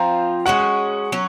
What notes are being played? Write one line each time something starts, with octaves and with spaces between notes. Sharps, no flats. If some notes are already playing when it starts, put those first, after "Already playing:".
Already playing: F3 C4 F4 A#5
G#3 C#4 F#4 F#5
F#3 C#4